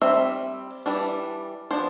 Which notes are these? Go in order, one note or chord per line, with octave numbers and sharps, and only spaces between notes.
G3 C4 E5
E3 G3 D4
F3 B3 D4 C5